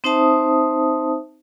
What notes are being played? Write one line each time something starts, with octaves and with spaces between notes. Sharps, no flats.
C4 D#4 C5 E5 A5 D#6